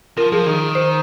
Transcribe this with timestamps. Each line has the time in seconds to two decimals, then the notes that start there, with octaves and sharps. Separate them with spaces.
0.17 F3 A#4
0.32 F3 G#4
0.46 D#3 G#4
0.75 C5